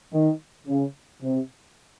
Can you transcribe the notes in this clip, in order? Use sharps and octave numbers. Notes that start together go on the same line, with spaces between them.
D#3
C#3
C3